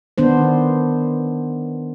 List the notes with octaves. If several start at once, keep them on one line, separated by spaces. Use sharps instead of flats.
D#3 B3 D4 C5